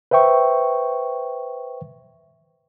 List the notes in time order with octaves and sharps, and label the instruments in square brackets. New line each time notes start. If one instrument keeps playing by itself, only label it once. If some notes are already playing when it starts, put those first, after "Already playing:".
[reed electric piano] B4 C5 E5 G5 C#6